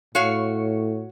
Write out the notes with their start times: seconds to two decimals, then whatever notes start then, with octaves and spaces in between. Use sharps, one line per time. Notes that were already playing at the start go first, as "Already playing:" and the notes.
0.15 A2 F#4 C#5 F5